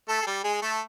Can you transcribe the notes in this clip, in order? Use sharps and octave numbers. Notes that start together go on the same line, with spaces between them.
A3 A4
G#4
G3 G4
G#3 G#4
A3 A4